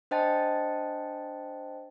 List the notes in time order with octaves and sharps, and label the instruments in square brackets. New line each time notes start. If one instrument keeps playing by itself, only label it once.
[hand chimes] D4 C5 D#5 G5 A5 A6